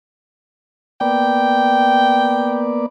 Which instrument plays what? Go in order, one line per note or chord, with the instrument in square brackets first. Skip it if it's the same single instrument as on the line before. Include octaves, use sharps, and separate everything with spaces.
[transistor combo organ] A#3 B3 D5 [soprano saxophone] G5